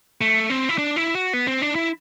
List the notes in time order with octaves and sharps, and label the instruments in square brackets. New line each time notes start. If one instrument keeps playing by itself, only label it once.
[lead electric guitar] A3
C4
E4
D4
E4
F#4
B3
C4
D4
E4